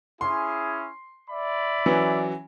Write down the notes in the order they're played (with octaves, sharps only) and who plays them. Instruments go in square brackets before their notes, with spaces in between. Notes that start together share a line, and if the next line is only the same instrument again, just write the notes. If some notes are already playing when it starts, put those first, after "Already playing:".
[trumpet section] C#4 E4 G#4 [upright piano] C6
[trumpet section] D5 E5 B5
[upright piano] E3 F#3 C#4